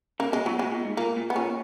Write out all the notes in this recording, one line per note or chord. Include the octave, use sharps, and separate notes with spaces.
C#3 A#3
B2 G#3
A#2 F#3
B2 G#3
A#2
G#2
A#2 A#3
A#2
B3
A#2 C#4